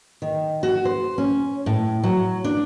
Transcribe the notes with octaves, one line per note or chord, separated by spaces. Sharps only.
D#3
F#4
C5
C#4
A2
F#3
D4